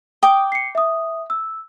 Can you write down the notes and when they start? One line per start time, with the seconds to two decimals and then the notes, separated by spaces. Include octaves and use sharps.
0.23 G5 D6 D#6
0.52 C7 C#7
0.75 E5 D#6
1.30 E6